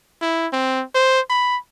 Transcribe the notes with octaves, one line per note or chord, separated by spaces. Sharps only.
E4
C4
C5
B5